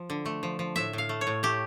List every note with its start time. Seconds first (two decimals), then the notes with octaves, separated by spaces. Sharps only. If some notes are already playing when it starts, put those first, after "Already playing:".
Already playing: F3
0.10 D3
0.26 A3
0.43 F3
0.59 F3
0.76 A2 E5
0.93 A2 F5
1.09 A3
1.21 C#5
1.27 A2
1.43 A3 G4